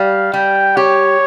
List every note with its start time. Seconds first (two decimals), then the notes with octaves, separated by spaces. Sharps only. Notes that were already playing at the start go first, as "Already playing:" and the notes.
Already playing: G3 F5
0.33 G3 G5
0.77 G4 C#5